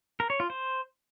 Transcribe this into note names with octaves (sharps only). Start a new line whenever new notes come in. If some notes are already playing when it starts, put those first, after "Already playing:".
A#4
C#5
F4
C5